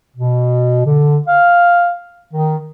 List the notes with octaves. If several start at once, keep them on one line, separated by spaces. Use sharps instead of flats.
B2
D3
F5
D#3